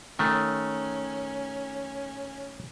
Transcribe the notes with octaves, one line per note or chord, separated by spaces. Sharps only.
D#3 A3 C#4